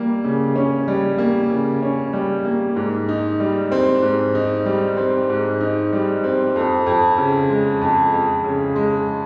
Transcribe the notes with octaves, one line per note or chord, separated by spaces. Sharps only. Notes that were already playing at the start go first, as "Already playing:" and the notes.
Already playing: G3 A#3
C#3
C#4
G3
A#3
C#3
C#4
G3
A#3
G#2
D#4
G3
C4
G#2
D#4
G3
C4
G#2
D#4
G3
C4
F2
F2
C#3
G#3
F2
F2
C#3
G#3